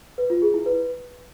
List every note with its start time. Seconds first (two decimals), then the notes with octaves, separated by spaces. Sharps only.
0.18 B4
0.30 F4
0.42 G#4
0.54 E4
0.66 B4